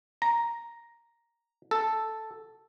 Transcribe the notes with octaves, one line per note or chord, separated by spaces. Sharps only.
A#5
A4